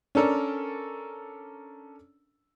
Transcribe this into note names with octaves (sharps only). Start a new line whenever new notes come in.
C#4 D4 A4 A#4